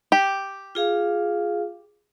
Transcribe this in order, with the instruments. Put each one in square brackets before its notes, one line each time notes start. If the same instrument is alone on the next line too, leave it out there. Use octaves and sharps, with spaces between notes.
[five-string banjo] G4
[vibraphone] F4 G#4 F5